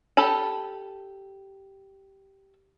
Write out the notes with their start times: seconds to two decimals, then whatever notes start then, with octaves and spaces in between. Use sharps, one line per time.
0.17 G4 A4 A5 B5